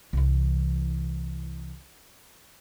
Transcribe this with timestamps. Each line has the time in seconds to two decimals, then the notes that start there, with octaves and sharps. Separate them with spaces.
0.13 C2 E3